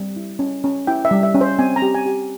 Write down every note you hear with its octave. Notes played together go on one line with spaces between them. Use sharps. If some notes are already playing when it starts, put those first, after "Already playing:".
Already playing: G3 C4
E4
C#4
C#4
E4 G5
E5
G3
E5
C#4
C5
C4 G#5
A#5
G4
G#5
G4